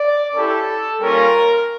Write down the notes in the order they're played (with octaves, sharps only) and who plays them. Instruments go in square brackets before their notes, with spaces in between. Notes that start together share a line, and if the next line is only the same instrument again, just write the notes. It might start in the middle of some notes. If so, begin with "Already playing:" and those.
Already playing: [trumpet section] D5
C#4 E4 G4 A4
G3 A#3 C#4 F4 A#4